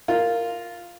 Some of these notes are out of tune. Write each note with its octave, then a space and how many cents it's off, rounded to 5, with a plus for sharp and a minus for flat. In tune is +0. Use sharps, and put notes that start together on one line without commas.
F4 +0 A#4 -10